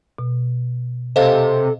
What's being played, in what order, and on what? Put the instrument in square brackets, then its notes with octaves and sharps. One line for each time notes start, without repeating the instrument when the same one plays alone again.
[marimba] B2
[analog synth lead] C3 [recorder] A4 [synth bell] C5 D#5 F5